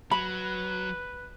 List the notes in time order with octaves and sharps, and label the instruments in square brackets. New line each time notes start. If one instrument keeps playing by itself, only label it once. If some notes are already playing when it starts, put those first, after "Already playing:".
[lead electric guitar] F#3 [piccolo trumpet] B4 [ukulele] B5